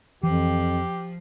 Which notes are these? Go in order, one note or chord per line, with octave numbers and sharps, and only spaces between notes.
F2 E3 F3 G4